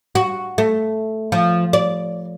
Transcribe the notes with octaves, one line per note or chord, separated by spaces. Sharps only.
F#4
A3
F3
D5